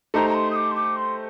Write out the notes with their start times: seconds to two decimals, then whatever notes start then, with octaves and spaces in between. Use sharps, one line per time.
0.14 A3 D#4 G4 C5 A#5
0.30 A#5
0.34 C6
0.50 D#6
0.56 D6
0.71 C6
0.75 D6
0.96 C6